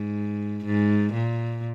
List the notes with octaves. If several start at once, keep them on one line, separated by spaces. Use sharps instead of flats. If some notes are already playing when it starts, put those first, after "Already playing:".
Already playing: G#2
G#2
A#2